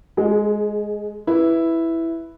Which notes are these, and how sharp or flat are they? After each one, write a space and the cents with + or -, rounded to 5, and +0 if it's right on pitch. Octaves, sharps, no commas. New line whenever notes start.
G#3 +0 G#4 +30
E4 +0 B4 +0